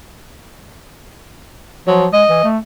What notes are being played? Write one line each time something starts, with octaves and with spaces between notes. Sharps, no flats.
F3 F#3
G#3 D#5
E3
A3